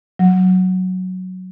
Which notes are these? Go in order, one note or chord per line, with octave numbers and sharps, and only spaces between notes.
F#3